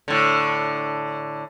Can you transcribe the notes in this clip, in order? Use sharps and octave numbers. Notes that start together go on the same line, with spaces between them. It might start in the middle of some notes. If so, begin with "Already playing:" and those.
A2 D3